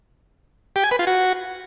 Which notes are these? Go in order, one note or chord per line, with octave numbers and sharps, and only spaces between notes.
G4
G#5
B4
F4
F#4